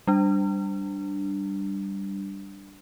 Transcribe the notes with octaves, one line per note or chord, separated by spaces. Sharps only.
G3 D4